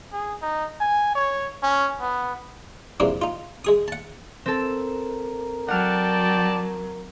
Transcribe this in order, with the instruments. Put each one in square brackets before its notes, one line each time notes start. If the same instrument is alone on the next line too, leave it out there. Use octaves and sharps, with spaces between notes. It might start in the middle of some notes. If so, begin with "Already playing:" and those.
[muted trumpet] G#4
D#4
G#5
C#5
C#4
B3
[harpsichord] G#2 C3 E3 F3 A#3 D4
D#4 F4
G#3 G#4 D#6
F#5 A5
[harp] C4 A4 [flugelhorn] A#4
[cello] F#3 [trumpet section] D5 G5 A5 [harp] F#5 F6